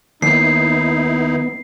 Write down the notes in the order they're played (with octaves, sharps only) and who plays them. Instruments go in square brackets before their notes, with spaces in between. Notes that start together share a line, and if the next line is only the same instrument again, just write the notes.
[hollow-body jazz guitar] D#2 [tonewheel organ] B3 [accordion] D#4 E4 [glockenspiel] C7